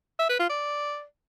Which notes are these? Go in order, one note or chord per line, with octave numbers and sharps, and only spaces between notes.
E5
B4
F4
D5